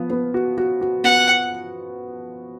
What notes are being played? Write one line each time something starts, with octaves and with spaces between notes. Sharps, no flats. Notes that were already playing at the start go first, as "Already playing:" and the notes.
Already playing: F3 B3
B3
F#4
F#4
F#4
B3 F#5